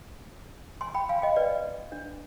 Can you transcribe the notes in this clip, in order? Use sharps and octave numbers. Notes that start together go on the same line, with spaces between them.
G#5 C6
G5 B5
F5 G#5
D#5 G5
B4 D5
D4